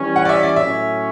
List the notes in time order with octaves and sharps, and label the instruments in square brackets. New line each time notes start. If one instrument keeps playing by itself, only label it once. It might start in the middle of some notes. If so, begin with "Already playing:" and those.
Already playing: [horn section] E3 G3 C#4
[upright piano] F#5
D5
E5
D5
[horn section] A2 F#3 C#4 [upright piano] E5